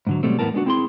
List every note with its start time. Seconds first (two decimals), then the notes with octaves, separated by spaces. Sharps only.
0.07 G#2 D3 F#3
0.23 B2 F#3 G3 A3 C4
0.39 E2 A2 B3 E4 A#4 A5
0.54 G#3 B3 D4 E4 F#4
0.66 C4 E4 G#4 C6